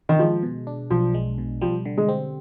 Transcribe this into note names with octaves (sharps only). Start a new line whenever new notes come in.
D#3
F3 G#3
B2
D4
B1 F3
G#3
B2
F3 G3
D3
G#3
C4